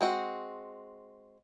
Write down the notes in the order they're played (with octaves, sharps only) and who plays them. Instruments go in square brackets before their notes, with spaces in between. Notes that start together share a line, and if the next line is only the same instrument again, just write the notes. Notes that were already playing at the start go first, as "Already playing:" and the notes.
[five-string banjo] G#3 C4 F#4